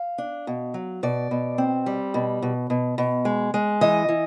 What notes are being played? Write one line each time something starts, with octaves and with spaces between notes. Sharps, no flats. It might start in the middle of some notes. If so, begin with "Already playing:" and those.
Already playing: F5
D4
B2
F#3
B2 D5
B2
C4
G3
B2
B2
B2
B2
G#3
G#3
E3 D#5
E3